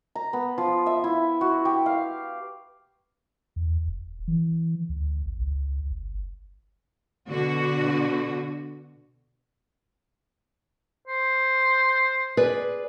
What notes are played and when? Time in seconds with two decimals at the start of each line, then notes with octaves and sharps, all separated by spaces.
0.15 A#5
0.33 B3
0.58 F3
0.86 E5
1.04 E4
1.41 F#4
1.65 G4
1.86 F5
3.56 E2
3.87 E1
4.28 E3
4.89 D2
5.25 G#1
5.41 C#2
5.90 G1
7.27 B2 D3 F#4
11.08 C5
12.37 G#4 B4 D5